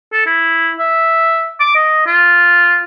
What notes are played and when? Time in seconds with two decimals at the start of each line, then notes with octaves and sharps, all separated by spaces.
0.13 A4
0.26 E4
0.79 E5
1.60 D6
1.75 D#5
2.07 F4